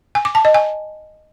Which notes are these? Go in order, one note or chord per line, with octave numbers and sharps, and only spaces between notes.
G#5
D6
A5
D#5
G#5